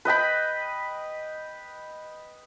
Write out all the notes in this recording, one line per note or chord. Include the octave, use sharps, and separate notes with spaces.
B4 D#5 G5 B5